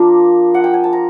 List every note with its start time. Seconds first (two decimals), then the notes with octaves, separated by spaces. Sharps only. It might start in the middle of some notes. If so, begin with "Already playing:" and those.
Already playing: F3 A#3 D4 F4 A#5
0.54 F#5
0.64 G5
0.74 G#5
0.84 A5
0.93 A#5